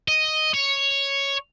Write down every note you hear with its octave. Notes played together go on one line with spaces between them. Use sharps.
D#5
C#5